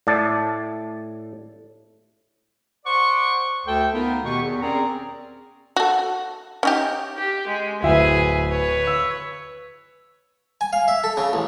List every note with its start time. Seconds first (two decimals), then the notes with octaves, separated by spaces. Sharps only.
0.07 A2 D5 A5
2.86 C5 D5 F#5 C6 C#6
3.66 D2 A4 G5
3.93 A3 B3 D#4 F4 A#4
4.25 B2 D#3 B3 G4 G5 C#6
4.42 E2
4.61 C4 C#4 G#4 A#4 D5 A#5
5.76 F#4 A4
6.63 C#4 D#4 G4
7.17 G4
7.47 G#3
7.83 D1 G#4 B4 E5
8.52 B4 C#5
8.87 E6
10.61 G#5
10.73 F5
10.88 E5
11.04 A4
11.17 C#3
11.33 A1